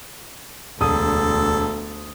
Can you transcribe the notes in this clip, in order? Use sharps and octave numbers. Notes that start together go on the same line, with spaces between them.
E1 D2 A4 D#6